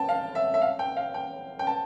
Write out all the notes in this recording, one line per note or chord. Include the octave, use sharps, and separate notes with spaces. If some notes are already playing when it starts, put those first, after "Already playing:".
Already playing: G5 A5
F5
E5
E5
F5
G5
F5
G5
G5
A5